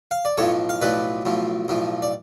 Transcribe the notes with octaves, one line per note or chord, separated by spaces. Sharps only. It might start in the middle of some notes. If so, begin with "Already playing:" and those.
F5
D5
B1 A2 F3 A4 C#5
F5
B1 A2 F3 B4 D5
B1 A2 F3
B1 A2 F3
D5